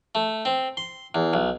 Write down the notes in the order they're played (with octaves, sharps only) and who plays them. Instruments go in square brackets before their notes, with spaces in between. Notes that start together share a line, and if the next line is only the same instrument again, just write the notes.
[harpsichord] A3
C4
C6
E2
B1